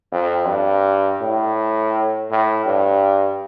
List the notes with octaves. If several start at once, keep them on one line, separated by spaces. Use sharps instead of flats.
F2
G2
A2
A2
G2